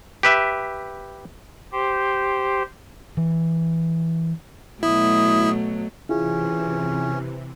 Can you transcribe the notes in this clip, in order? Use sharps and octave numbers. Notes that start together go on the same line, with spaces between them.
G4 B4 E5
G4 C5
E3
B2 F#3 A3 E4 D#6
C3 E3 C#4 E4 F4 G#4